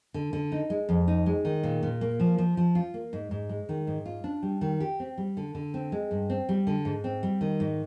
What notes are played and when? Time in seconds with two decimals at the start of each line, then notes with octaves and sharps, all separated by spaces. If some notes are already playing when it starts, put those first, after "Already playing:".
0.14 D3
0.33 D3
0.52 D#4
0.70 G#3
0.89 F2
1.08 D#4
1.26 G#3
1.45 D#3
1.63 A#2
1.83 A#2
2.01 A#3
2.20 F3
2.38 F3
2.57 F3
2.75 F4
2.94 A#3
3.13 G#2
3.31 G#2
3.49 G#3
3.69 D#3
3.87 G#2
4.06 F4
4.24 D4
4.43 G3
4.61 D#3
4.80 G4
5.00 C4
5.18 G3
5.37 D3
5.55 D3
5.74 C4
5.92 G#3
6.11 G2
6.30 C4
6.49 G3
6.67 D3
6.85 G#2
7.04 C4
7.23 G3
7.41 D#3
7.60 G#2